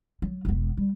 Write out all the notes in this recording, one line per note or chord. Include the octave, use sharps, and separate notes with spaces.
F#3
E1 B3
G3